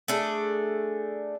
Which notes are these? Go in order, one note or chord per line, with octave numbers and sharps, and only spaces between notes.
A3 D4 G#4